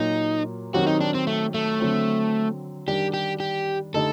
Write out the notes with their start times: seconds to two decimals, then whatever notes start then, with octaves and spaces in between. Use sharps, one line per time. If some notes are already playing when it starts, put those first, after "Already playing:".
Already playing: A#2 F#3 A#3 D#4
0.73 D#3 F#3 C4 F#4 G4
0.87 D#4
1.01 D4
1.15 C4
1.27 A3
1.54 A3
1.80 D3 F#3 C4
2.87 D#3 G3 D4 G4
3.14 G4
3.40 G4
3.94 D3 A3 D#4 G4 A4